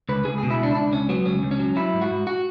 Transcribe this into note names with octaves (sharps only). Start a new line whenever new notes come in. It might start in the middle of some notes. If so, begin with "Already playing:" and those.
C#2 B4
C#2 G#4
B2 G#4
E4
C#2 D4
E4
C#2 D4
C#2 C#4
F#3 B3
C#2 C#4
C#2
C#4
F#3
F#3 E4
G#2
F#4
G#2
F#4